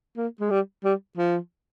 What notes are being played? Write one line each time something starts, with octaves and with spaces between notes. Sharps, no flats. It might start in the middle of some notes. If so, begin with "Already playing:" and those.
A#3
G#3
G3
G3
F3